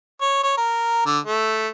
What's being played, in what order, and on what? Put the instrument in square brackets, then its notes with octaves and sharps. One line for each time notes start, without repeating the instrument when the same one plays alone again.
[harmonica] C#5
C#5
A#4
D3
A3